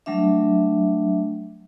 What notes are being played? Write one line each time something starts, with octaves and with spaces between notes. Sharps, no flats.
F#3 G3 A3 D4 E5